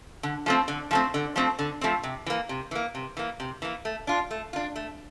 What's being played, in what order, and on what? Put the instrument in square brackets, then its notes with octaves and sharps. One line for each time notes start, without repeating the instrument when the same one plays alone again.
[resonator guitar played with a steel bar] D3
F3 A3 C4
D3
F3 A3 C4
D3
F3 A3 C4
D3
F3 A3 C4
C3
E3 A#3
C3
E3 A#3
C3
E3 A#3
C3
E3 A#3
A3
D4 F4
A3
D4 F4
A3